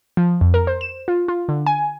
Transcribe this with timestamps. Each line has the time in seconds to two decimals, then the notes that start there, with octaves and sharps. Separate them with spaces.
0.17 F3
0.41 F2
0.54 A#4
0.67 C5
0.81 E7
1.08 F4
1.28 F4
1.49 D3
1.66 G#5